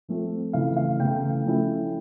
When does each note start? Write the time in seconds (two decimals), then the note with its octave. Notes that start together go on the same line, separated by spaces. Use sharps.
0.08 F3 A3 C4
0.53 C#3 E3 A3 F5
0.76 F5
0.99 C#3 E3 A3 G5
1.45 F3 A3 C#4 E4